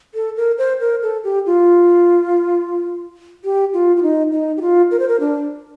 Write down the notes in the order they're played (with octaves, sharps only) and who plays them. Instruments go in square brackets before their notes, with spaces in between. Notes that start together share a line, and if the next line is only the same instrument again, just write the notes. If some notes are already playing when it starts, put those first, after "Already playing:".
[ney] A4
A#4
C5
A#4
A4
G4
F4
G4
F4
F4
D#4
D#4
G4
F4
A#4
C5
A#4
D4